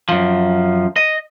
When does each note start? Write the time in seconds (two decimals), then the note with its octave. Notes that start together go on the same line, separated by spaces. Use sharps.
0.09 F#2 F3
0.96 D#5